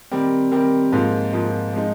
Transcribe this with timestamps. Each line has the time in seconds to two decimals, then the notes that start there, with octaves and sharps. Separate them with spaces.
0.12 D#3 G3 C4 G4 A#4
0.51 D#3 G3 C4 G4 A#4
0.92 G#2 F3 A#3 F4
1.33 G#2 F3 A#3 F4
1.73 F3 G#3 D#4